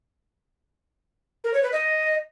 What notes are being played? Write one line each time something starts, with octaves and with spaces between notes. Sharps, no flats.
A#4
C#5
B4
D#5